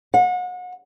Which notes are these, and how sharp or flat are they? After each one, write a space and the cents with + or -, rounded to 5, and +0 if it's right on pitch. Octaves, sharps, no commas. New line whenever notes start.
F#5 -35